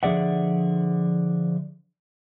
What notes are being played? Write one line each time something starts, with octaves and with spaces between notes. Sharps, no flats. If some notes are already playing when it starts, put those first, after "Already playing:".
D3 F3 G#4 D5 E5 F#5